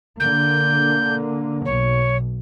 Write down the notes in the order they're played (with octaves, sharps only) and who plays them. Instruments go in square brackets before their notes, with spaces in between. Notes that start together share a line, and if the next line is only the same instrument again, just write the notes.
[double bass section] D3 A#3 [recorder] G6
[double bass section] B1 [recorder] C#5